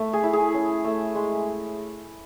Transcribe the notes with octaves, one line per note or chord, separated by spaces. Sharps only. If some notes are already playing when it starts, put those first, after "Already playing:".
Already playing: A3
G#4
E4
G#4
C#4
A3
G#3